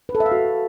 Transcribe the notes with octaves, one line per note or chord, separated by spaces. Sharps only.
B4
A4
E5
F5
F#4